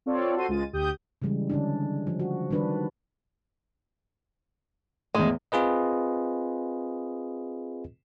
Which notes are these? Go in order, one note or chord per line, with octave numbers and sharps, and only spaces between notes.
C4 F4 A4 C#5 D5
F#4 A4 C5 C6 D#7
C#2 G#3 F4 A6 D#7
D2 G4 D#6 G6
C#3 E3 G3 G#3
D3 C#4 D4
F3
F#4
D#3 G3 D4 B4
E2 A2 G#3
C4 F4 G#4 B4 D#5